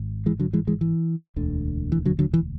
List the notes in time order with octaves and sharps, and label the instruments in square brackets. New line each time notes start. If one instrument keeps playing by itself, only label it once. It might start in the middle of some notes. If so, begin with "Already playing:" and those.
Already playing: [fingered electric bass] G#1 G#2
E3 G#3
D3 F#3
E3 G#3
E3 G#3
E3
E1 D2 D3
E3
D3 F#3
D3 F#3
E3